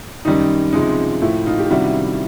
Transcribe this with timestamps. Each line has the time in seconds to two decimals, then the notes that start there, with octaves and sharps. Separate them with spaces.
0.25 F#2 D#3 G3 D#4
0.73 C#2 C3 F3 G#3 D#4
1.22 A2 F3 A3 E4
1.46 D#4 F4
1.59 G4
1.70 C#2 C3 D#3 G3 E4 F#4